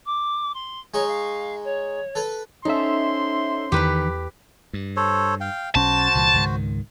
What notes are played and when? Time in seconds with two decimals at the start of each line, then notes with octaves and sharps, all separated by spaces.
0.06 D6
0.54 C6
0.94 G#3 D#4 C#5 C#6
1.07 F5
1.64 C#5
2.15 A4 B4
2.65 C#4 D#4 A4 C5 E5 C6
3.72 E2 D#3 E3 G4 B4
4.73 G2
4.96 A4 C5 C#5
5.41 F5 G5
5.75 B1 C#4 F#4 C5 A5
6.15 C2 A#2 E3
6.34 C#2 G#2 D#3